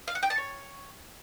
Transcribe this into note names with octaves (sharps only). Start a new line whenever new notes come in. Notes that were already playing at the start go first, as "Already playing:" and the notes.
F5
F#5
G5
A5
C#5